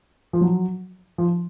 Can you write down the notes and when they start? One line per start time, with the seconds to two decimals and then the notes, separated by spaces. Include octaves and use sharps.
0.33 F3
0.41 F#3
1.18 F3